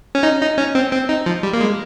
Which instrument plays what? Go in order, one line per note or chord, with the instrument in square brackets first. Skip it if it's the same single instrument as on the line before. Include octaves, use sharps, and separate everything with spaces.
[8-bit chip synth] C#4
D#4
D#4
C#4
C4
C4
D#4
F3
G3
A#3
G#3